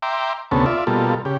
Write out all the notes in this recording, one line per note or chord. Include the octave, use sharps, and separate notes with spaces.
E5 G5 A#5 C6 D6
D2 C3 B3 C#4 A4
F4 D5 E5
B2 G3 A#3 F4 A4
C#3 G4